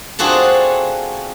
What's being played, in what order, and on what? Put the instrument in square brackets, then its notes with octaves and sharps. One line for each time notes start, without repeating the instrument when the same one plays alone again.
[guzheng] C4 D4 F4 F#4 G#4 A4